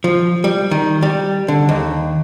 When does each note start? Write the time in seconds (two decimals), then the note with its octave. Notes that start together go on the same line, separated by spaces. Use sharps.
0.04 F3
0.44 G3
0.71 D#3
1.03 G3
1.48 D3
1.69 D#2